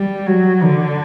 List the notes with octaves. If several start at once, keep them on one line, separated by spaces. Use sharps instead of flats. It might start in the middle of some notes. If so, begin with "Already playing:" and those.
Already playing: G3
F#3
D3